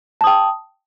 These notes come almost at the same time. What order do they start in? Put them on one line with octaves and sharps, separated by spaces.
A5 D#6 G5